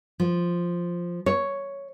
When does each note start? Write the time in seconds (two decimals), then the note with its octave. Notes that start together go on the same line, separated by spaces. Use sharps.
0.20 F3
1.26 C#5